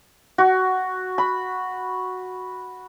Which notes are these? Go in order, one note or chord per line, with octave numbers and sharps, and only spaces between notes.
F#4
B5